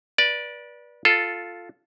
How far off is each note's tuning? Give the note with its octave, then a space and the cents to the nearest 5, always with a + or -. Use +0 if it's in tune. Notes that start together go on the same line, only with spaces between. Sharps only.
B4 -30 D5 +0
F4 +0 A4 +0